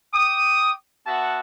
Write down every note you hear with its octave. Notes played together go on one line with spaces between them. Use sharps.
G5 D6 D#6
B3 F#4 E5 F#5 A5